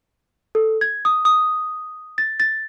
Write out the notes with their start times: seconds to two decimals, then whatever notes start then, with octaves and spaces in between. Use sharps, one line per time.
0.55 A4
0.81 G#6
1.05 D#6
1.25 D#6
2.18 A6
2.40 A6